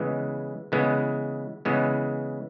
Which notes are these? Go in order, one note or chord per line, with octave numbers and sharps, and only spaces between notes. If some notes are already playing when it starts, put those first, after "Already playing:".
Already playing: C#3 E3 G#3 B3
C#3 E3 G#3 B3
C#3 E3 G#3 B3